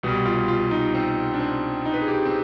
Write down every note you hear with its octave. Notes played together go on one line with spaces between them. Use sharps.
C2 B2 G3
F4
F4
D#4
C4
D4
C4
D#4
B4
G#4
G4
C4